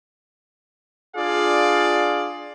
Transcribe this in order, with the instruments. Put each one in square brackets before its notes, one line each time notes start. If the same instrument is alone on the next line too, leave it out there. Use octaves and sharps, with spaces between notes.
[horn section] D4 F4 G#4 D5 F5